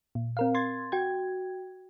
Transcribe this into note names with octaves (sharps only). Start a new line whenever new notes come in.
A#2
C4 A#4 F5
C6 G#6 A6
F#4 G5 G#6